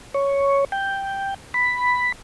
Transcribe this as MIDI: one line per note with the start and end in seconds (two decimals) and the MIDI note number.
0.14 0.65 73
0.72 1.34 79
1.54 2.12 83